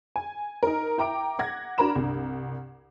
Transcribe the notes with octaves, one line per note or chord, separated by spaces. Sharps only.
G#5
D#4 A#4
E4 G5 A#5 D6 D7
F#5 G#6 A#6
D4 F#4 A#4 A#5 B5 E7
C2 G2